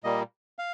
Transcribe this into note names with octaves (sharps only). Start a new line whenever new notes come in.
A#2 G3 A#3 D#5
F5